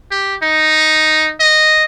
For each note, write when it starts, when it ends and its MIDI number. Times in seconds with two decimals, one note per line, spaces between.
0.11 0.36 67
0.43 1.33 63
1.40 1.84 75